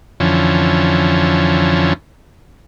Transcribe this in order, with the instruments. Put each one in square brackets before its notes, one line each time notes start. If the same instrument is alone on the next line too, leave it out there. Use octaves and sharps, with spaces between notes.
[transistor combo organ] F2 D3 E3 F3 C#4